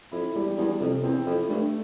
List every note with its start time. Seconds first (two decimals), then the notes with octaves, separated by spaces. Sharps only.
0.11 F2 E4
0.35 E2 G3
0.58 E2 G3
0.80 F2 C3
1.03 E2 C4
1.26 F2 E4
1.49 G2 A3